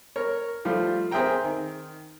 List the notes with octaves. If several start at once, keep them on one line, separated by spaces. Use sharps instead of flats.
A#4 C#5
F3 G3 A3 F4 C5
C4 G#4 A#4 E5 G5 A#5
D#3